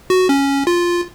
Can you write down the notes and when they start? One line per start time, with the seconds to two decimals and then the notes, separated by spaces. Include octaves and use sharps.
0.10 F#4
0.29 C#4
0.67 F4